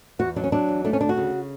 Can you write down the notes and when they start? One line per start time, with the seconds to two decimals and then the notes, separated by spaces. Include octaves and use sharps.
0.19 E2 F#4
0.36 F#3 D4
0.44 C#4
0.52 F#3 D4
0.69 E2
0.85 A3 D4
0.93 C#4
1.01 D2 D4
1.09 F#4
1.17 C#3